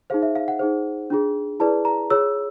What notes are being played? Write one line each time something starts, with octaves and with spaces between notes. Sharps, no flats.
D#4 G#4 C5 F5
E5
F5
F#5
D#4 G#4 C5
D4 F4 G#4
E4 G#4 B4 D5 A5
A#5
F4 G#4 C#5 E6